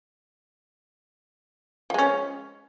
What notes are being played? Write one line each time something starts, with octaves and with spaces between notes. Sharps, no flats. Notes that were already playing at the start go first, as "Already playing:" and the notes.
F3 G#3 C#4